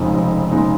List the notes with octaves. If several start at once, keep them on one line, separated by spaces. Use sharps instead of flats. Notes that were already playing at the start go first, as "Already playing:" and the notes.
Already playing: F1 F2 C#3 G#3 D#4
F1
C#3 G#3 D#4